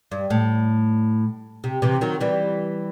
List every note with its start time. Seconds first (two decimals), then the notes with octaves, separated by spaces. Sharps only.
0.11 G2
0.30 A2
1.64 C3
1.82 C3 E3
2.01 D#3 F#3
2.21 E3 G3